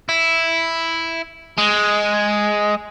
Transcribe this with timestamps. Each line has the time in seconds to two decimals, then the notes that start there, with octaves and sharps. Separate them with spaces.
0.09 E4
1.58 G#3